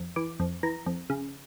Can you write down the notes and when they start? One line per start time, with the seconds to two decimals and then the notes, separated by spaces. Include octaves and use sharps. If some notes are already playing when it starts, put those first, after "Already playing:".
Already playing: F2
0.16 E3 D6
0.40 F2
0.63 E3 A#5
0.86 F2
1.10 C#3